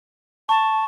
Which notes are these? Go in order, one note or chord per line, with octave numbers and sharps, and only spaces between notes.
A5 C#6